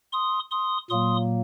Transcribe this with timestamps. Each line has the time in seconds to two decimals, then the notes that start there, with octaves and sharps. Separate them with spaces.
0.13 C6 D#6
0.51 C6 D#6
0.90 A#2 F#3 A#3 C6 D#6